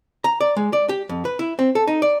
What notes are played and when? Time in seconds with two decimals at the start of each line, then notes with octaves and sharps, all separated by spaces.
0.24 A#5
0.41 D5
0.57 G#3
0.73 D5
0.89 G4
1.09 F2
1.25 B4
1.39 E4
1.59 C4
1.75 A4
1.87 D#4
2.02 D5